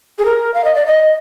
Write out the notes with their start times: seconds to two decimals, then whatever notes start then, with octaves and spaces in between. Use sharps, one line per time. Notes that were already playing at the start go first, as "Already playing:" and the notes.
0.18 G#4
0.25 A#4
0.54 F5
0.64 D#5
0.75 D5
0.86 D#5